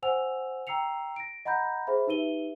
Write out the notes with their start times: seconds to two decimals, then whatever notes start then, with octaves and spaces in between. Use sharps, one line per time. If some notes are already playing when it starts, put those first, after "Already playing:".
0.03 C5 F#5 G#5 E6 F7
0.67 G5 A#5 E6 C7 C#7 F7
1.16 A#6 D7
1.45 D#5 F#5 A#5 B5 G6 A#6
1.87 G#4 C5 E5 B5
2.07 D#4 G4 B4 E5 D#7 G7